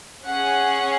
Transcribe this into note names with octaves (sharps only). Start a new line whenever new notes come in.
C#4 G#4 F#5